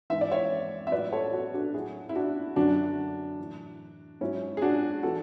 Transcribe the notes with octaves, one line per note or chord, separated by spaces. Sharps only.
G#2 E3 E5
D5
C#5 E5
E5
A2 F#3 B4 D5
A4 C#5
F#4 A4
D4 F#4
A2 F#3 E4 G#4
E4
D4 F#4
F#2 D3 F#3 D4 F#4
A2 E3
G#2 F#3 C#4 E4
G#4
D4 F#4
E3 F#4 A4